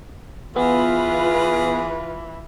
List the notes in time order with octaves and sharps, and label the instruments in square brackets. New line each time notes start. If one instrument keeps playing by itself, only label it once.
[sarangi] E3 [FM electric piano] B3 [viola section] F4 B4 [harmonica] G#4